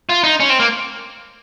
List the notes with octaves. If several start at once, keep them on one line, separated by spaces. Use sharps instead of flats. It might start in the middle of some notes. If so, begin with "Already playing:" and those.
F4
D#4
C#4
C4
A#3